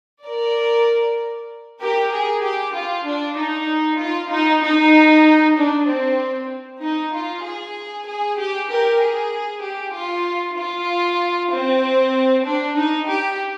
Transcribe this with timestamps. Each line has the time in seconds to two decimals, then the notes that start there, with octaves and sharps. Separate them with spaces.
0.24 A#4 D5
1.81 G4 A#4
2.12 G#4
2.43 G4
2.74 F4
3.07 D4
3.37 D#4
3.99 F4
4.31 D#4
4.63 D#4
5.57 D4
5.88 C4
6.82 D#4
7.13 F4
7.45 G#4
8.07 G#4
8.39 G4
8.69 G4 A#4
9.01 G#4
9.63 G4
9.94 F4
10.57 F4
11.52 C4
12.45 D4
12.77 D#4
13.08 G4